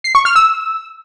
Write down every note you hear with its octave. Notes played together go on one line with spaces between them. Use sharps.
C7
C#6
F6
E6